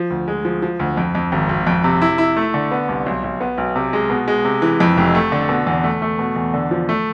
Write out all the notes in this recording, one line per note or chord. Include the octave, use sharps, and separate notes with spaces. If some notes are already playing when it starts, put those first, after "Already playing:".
Already playing: F3
D2
G#3
F3
F3
D2
F2
F2
G#1
G#1
F2
C3
E4
E4
A3
D3
B3
C2
B1
B1
B3
B1
C3
G#3
B2
G#3
C3
E3
F2
F1
A3
D3
B2
E2
A3
A3
B2
E2
D3
F3
A3